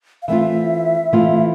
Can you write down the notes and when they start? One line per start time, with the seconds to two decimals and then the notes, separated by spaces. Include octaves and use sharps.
0.22 F5
0.28 E3 A3 C4 F4 E5
1.13 E3 A3 C4 F4